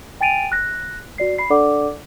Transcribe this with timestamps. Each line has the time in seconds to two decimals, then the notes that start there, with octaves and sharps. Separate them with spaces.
0.21 G5 G#5 A6 D7 D#7 F7
0.52 F#6 A#6
1.18 F#4 D5 C7
1.38 B5 C7
1.50 D4 A4 D5 F#5 D6